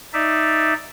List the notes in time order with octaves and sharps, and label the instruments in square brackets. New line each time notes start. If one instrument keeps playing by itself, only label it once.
[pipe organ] D#4 D5 E5